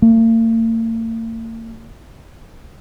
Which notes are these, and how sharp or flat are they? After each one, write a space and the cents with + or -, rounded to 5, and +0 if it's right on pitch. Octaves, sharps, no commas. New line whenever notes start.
A#3 -45